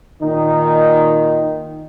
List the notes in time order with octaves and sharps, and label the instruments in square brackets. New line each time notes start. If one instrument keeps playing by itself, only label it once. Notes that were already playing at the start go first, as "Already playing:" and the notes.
[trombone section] A#2 D#3 D#4